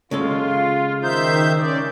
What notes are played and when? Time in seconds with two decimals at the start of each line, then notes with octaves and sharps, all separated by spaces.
0.11 C#3 G#3 F4 A4
0.48 F5
1.03 D#3 D#4 C5 E5 G6
1.57 C#4 D5